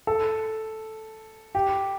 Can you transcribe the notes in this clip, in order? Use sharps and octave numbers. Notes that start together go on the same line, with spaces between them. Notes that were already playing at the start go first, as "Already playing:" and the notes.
A4
G4